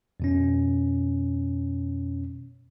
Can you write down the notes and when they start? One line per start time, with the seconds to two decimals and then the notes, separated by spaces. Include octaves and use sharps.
0.20 F2 B2 C#4